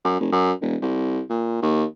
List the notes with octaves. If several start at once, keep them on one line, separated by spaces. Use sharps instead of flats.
F#2
F1
F#2
E1
C2
A#2
D#2